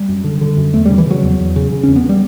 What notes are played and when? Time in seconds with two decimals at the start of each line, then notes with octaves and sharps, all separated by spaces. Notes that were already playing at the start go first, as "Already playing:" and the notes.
Already playing: G3
0.09 F#2
0.24 D3
0.41 D3
0.57 F#2
0.74 E2 A3
0.85 C#3 G3
0.98 E3
1.06 C#3 F#3
1.23 E2
1.40 E2
1.56 C#3
1.72 C#3
1.83 E2 C#4
1.96 B3
2.09 G3